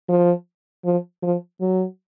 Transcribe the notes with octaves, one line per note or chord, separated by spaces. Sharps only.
F3
F3
F3
F#3